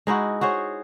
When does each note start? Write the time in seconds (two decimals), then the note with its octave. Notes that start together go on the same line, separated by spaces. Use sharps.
0.07 G#3 D#4 E4 F#4
0.41 F#4 G#4 C5 C#5